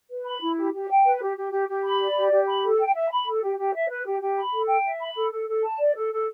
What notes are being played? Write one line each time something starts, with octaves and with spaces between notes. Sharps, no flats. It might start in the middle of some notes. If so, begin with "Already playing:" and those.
B4
B5
E4
G4
G4
G5
B4
G4
G4
G4
G4
B5
D5
G4
G4
B5
A4
G5
E5
B5
A4
G4
G4
E5
B4
G4
G4
B5
A4
G5
E5
B5
A4
A4
A4
A5
D5
A4
A4